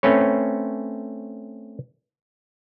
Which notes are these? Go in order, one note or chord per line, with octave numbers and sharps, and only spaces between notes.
A3 C4 C#4 B4 C#5